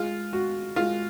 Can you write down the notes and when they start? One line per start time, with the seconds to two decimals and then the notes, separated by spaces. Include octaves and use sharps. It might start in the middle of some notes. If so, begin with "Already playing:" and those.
Already playing: G#3 F4
0.33 F#4
0.76 G#3 F4